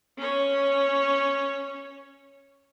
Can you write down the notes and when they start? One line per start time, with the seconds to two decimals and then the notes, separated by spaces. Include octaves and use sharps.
0.18 C#4 C#5